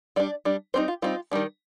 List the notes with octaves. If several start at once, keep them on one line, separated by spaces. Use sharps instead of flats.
G3 D4 D5
G3 D4
G3 C4 D#4 C5
F4
G3 C4 D#4 F4
D#3 G3 D4